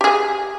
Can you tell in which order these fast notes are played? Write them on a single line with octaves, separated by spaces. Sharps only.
G4 G#4 G#5